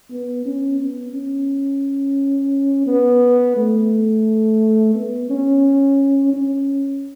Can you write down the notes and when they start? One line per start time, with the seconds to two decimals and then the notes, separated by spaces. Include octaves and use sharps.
0.11 B3
0.45 C#4
0.79 B3
1.13 C#4
2.87 B3
3.56 A3
4.95 B3
5.30 C#4
6.33 C#4